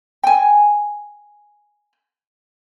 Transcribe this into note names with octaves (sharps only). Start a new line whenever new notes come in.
G5 G#5